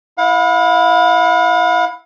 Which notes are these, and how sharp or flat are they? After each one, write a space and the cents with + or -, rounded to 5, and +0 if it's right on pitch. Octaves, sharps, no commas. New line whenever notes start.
E4 +0 F5 +45